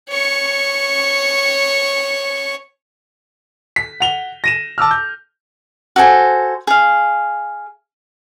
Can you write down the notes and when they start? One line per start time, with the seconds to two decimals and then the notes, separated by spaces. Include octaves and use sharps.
0.11 C#5 C#6
3.76 B6
4.00 F#5 F7 G7
4.44 A#6 D#7 E7
4.78 A5 D6 E6 F6
4.91 G6
5.96 F#4 A4 C5 G#5
6.67 G#4 F5